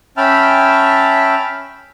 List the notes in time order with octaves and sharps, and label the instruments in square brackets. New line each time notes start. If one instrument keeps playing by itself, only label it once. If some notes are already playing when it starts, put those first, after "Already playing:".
[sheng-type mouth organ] C#4 E5 G5 A5 B5 F6